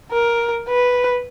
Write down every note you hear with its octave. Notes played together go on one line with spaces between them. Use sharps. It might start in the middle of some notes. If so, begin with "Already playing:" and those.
A#4
B4